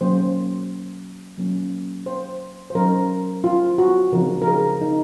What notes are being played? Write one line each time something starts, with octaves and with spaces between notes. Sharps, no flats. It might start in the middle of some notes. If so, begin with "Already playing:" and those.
F#3 A#3 C#4 C5
F#3 A#3 C#4
C5
C5
F#3 C#4 A#4
F4
F#4
C#3 F3 C4 A#4
A#4
G#4
D#4